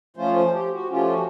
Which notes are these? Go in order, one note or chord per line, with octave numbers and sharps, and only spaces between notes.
F3 A3 C#4 F4 C5
C5
G4
F#4
F3 A3 C#4 F4 G4
F#4